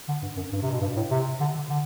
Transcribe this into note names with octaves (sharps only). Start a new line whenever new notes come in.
D3
G2
F#2
G2
C3
B2
G2
A2
C3
D3
D3
D3